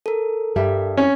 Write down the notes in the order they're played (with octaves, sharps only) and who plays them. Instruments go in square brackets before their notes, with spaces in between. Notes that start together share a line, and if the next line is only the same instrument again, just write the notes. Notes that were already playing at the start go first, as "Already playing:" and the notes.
[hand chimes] A4 A#4
[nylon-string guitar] G2 G3 E5
[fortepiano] C#4